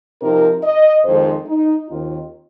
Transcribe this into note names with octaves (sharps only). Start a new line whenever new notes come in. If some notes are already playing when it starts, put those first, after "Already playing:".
C3 F3 C4 D#4 A#4
D#5
F2 D#3 G#3 D#4 C5
D#4
D#2 D#3 C4 D#4 F4